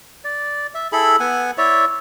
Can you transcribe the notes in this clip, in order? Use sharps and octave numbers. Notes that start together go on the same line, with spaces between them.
D5
E5
E4 G#4 A4 B5
B3 F#5 G#5
E4 C#5 D5 E5